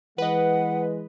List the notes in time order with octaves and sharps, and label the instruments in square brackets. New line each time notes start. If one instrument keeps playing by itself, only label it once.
[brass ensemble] E3 G#3 [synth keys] B4 D#5 [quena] F#5